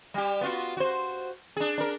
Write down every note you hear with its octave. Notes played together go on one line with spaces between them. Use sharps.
G3 G4
B3 F4 F#4
F#4 C5
D4 G#4
D4 A#4